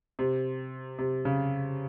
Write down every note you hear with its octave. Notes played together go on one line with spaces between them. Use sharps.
C3
C3
C#3